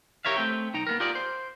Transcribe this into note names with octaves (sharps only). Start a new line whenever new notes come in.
G4 A#4 C#5 E5 F5
A3 C4 G5
B1 D#4 G5 A#5
A#3 B3 A#4
F4 G4 G#4 A#4 D5
C5